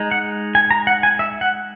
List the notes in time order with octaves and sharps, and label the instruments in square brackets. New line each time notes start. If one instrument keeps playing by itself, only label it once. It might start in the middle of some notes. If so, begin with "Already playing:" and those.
Already playing: [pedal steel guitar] G#3 D#4
F#5
G#5
A#5
F#5
G#5
E5
F#5